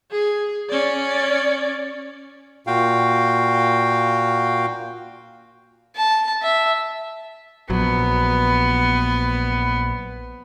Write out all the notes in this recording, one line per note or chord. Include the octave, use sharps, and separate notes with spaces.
G#4
C#4 D5
A#2 F#4 F5 G5
A5
E5
A#1 F#3 B3